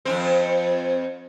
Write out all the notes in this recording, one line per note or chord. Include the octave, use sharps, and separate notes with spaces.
F2 G#2 C4